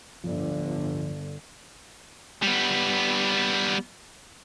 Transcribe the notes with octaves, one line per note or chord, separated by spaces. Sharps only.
D1 G1 D3 F3
G3 B3